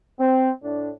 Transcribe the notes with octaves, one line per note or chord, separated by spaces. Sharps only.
C4
A2 D4